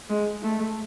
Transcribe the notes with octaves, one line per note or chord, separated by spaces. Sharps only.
G#3
A3